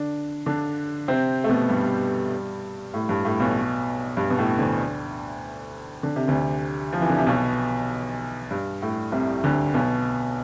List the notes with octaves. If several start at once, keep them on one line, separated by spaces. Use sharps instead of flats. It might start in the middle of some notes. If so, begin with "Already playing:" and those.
Already playing: D3 D4
D3 D4
C3 C4
A3
B2 B3
G2 G3
A2
G2
A2
B1 B2
G2
B2
A2
D2 D3
D3
C3
D2 D3
F3
E3
D3
C3
B1 B2
G2
A2
C2 C3
D2 D3
B1 B2